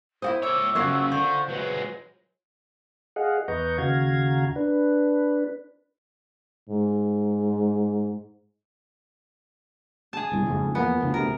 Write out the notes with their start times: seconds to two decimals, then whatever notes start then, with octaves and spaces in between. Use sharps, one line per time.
0.22 E4 F#4 C5 D#6
0.43 C#5 E5 D6 E6
0.75 F#2 C#3 F4 C5 C#5 F#5
1.12 D3 C5 C#6
1.49 F#3 G#3 B4
3.16 G#4 D#5 F5 F#5
3.48 E2 B4 D#5 A#5 C#6 G6
3.78 D#2 C#3 F#4 F5 A#5 G#6
4.56 D4 B4
6.69 G#2
10.13 G#4 A5
10.32 G1 C2
10.46 F#1 F2 G#2
10.75 E2 F3 A#3 B3
11.00 F#1 D2 F3
11.14 D1 D2 C3 A#4